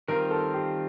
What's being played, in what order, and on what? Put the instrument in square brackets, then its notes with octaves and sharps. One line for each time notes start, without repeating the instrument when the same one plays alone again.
[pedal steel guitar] D#3 G3 C4 F4 [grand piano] A#4
[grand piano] A4
G4